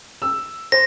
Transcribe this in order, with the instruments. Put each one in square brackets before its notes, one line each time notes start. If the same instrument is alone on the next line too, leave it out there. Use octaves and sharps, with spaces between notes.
[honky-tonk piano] E6
[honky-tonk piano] C5 [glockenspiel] A#6